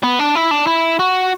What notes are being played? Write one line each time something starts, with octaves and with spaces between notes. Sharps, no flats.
B3
D4
E4
D4
E4
F#4